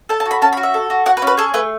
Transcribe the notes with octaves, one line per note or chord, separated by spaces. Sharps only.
A4 A5
A5
F#4
B5
C#4 A5
B5
F#4
E5
A4
F#4
F#4 F#5
B4
C#4
B4
G#4 A4
A3 B4